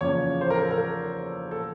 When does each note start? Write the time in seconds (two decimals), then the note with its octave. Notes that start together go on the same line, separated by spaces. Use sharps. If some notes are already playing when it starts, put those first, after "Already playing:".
0.01 E2 C#3 F3 A#3 C#4 C#5
0.41 C5
0.50 A#4
0.61 A4
0.71 A#4
1.51 A4